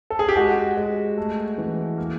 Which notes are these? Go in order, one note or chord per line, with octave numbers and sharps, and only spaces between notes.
A4
G#4
G4
G#3 F#4
G#3
A3
E3
A#3